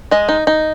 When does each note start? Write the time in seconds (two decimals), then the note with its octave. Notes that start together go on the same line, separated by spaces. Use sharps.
0.11 G#3 D#5
0.29 D#4
0.47 D#4